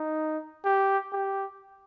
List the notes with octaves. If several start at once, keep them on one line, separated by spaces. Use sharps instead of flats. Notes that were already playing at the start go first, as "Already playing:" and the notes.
Already playing: D#4
G4
G4